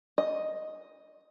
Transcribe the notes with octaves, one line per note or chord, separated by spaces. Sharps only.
D#5